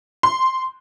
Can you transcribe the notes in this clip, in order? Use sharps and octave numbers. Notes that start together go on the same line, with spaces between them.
C6